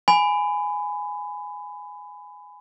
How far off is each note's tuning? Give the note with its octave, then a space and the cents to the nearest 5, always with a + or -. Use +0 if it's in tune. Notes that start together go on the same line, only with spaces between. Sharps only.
G#5 +0 B5 +20